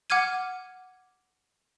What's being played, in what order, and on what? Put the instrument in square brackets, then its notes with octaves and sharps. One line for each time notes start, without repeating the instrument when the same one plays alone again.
[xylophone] F#5 D6 F6 G#6 D#7